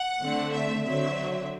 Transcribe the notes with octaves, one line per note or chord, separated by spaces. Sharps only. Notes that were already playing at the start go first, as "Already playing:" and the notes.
Already playing: F#5
D3 A3 C4
E5
D3 F#3 C4 E5